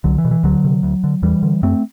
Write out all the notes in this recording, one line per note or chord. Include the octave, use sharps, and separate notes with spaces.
C2 D3 F#3
E3
B2
E3
D2 D3 F#3
C3
D2
D3
E2 E3 G3
D3
F#2 A3 C4